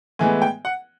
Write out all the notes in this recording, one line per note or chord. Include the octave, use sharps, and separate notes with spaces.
A2 E3 G#3 B3 G#5
G5
F#5